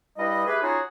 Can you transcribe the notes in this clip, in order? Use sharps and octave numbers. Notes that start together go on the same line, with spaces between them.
G2 G3 E4 B4 D#5
A3 G4 G#4 B4
C#4 D#4 F4 F#4 G#4 C#5